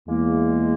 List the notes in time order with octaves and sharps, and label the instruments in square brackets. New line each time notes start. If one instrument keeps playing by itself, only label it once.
[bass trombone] E2 [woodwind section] G#3 A#3